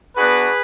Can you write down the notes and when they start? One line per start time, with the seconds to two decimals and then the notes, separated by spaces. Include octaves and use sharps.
0.16 B3 D4 F#4 G#4 B4